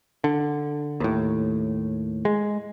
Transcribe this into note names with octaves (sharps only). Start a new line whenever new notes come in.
D3
D#2 A2
G#3